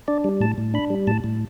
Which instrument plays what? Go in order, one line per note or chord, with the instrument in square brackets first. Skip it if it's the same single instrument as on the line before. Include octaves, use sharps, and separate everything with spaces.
[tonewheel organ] D4 D5
G3
A2 A5
A2
D4 B5
G3
A2 A5
A2